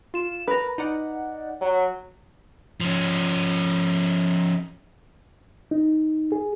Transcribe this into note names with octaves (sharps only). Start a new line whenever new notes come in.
F4 E7
A#4 B4 A#5
D#4 D5 F#5
F#3
F3 C#4
D#4
G#4